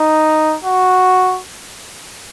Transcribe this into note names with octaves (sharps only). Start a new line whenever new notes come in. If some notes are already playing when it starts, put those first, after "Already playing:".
Already playing: D#4
F#4